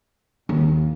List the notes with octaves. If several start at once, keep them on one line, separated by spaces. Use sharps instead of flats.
D#2